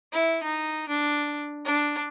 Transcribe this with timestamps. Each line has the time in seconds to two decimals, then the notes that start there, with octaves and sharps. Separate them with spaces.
0.13 E4
0.43 D#4
0.89 D4
1.66 D4